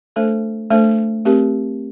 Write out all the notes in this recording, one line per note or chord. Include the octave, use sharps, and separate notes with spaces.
A3 D4 A4 C5
A3 D4 A4 C5
A3 C4 G4 A#4